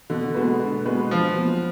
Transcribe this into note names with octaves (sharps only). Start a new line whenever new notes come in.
B2 D3
G#3 B3 F#4 B4
B2
G#3 B3 F#4 B4
D3 F3
F#3 B3